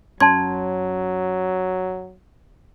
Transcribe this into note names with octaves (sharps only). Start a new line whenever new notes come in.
F#2 F#3 C#4 A5 C6 G#6